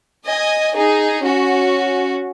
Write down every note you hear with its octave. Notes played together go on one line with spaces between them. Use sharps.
D#5 G#5
D#4 G#4
C#4 F#4